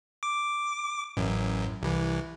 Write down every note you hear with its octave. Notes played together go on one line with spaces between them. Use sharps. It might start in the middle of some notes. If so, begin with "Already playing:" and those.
D6
A1 F#2
C2 E3